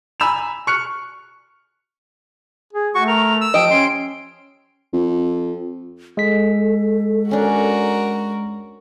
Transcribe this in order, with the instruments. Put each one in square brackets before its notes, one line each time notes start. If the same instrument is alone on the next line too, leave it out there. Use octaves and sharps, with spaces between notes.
[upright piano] G#5 A#5 B5 E6 E7 F7
C#6 F6 F#6 C#7
[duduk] G#4
[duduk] A3 [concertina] F#4 C#6
[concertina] A#4 [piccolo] F7
[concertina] E6
[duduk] F3 [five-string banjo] G4 D#5 [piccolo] D7
[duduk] C#4 [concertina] C6
[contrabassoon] F2
[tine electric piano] G#3 B6 [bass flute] A4
[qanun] C#4 D4 [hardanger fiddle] F#4 A#4